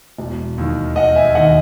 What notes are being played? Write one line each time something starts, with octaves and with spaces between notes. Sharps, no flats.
E1
D#2 D#3
E1 D#5 F#5
E5 G#5
D#2 D#3 D#5 F#5